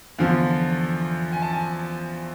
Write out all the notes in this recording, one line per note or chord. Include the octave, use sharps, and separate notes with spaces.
E2 D3 F3 F5
G#5
A5
G#5